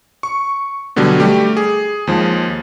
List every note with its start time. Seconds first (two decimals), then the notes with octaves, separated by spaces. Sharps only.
0.23 C#6
0.96 B2 D3 F#3 G3
1.20 G3 A3 G4
1.57 G#4
2.07 D#2 F3 G#3